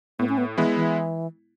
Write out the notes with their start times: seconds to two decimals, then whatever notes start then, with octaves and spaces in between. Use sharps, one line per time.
0.19 A2 B3
0.29 C#4
0.38 B3
0.57 E3 G#3 B3 E4
0.76 E3